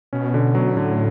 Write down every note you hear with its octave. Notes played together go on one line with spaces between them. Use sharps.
B2 C#4
D3
F#3
A2 D3